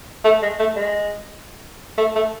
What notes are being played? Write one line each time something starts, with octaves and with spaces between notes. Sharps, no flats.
A3
G#3
A3
G#3
A3
A3